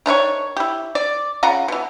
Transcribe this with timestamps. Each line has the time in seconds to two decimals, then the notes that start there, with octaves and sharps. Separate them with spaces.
0.06 D#3 D4 E4 C#5
0.57 E4 G4
0.95 D5
1.43 C#3 F4 F#5 A#5
1.68 B2 E3